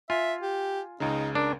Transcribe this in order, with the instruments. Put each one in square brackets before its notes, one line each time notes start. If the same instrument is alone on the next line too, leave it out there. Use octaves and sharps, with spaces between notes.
[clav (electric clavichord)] F4 [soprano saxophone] E5 [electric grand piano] G#5
[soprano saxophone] G4
[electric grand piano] C#2 C#3 [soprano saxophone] D#4
[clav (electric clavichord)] D4 [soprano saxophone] A#4